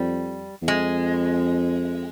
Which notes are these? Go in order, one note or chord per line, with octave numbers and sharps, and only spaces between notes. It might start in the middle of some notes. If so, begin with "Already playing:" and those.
Already playing: F2 G3
E2
F2 G#3